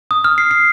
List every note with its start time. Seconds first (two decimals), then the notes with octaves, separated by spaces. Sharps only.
0.11 D#6
0.24 F6
0.38 C7
0.51 C7